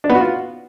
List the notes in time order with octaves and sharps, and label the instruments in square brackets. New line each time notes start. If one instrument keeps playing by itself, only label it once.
[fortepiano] D4
B3
F#4
F4